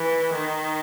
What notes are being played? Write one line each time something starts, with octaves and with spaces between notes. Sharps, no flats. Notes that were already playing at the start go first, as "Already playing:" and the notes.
Already playing: E3
D#3